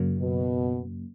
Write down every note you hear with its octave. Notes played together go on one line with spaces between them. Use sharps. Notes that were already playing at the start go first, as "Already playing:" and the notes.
Already playing: F#2 C#3 F#3 A#3
B2